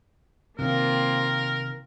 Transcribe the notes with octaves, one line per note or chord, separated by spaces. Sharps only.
C3 D#3 A#3 C4 F4 A#4